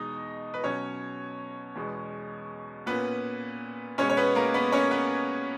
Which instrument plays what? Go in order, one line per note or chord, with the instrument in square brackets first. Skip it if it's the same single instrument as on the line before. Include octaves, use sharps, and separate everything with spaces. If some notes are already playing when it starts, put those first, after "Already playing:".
Already playing: [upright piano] E2 B2 G#3 D#4 D#5
B4
B2 F#3 B3 C#4 C#5
E2 B2 G#3 B3
A#2 A#3 B3 C#4 B4
B2 G#3 B3 C#4 C#5
C#5
B3 B4
A#3 A#4
B3 B4
C#4 C#5
B3 B4